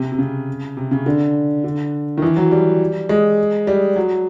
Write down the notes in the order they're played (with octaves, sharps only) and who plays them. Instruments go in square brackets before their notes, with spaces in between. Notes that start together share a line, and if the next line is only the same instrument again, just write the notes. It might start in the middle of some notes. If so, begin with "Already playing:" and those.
Already playing: [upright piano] C3
C3
C#3
C3
C#3
D3
D3
D#3
E3
F#3
G3
G#3
G3
F#3